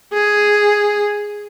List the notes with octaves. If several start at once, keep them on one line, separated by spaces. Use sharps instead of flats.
G#4